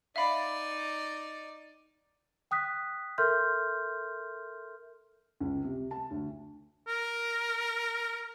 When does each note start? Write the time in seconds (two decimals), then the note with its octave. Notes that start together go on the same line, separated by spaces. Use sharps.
0.16 D#4 D5 E5 F5 B5
2.51 G5 D#6 F#6 B6
3.18 A4 A#4 E5 C6 F6 G6
5.41 C#2
5.65 C3
5.91 A5
6.11 D2
6.87 A#4